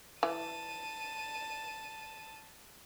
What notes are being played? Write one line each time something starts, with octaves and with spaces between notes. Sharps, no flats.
E3 A5 D#7